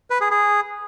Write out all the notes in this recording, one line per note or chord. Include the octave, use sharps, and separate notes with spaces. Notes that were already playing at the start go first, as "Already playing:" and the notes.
B4
G#4
G#4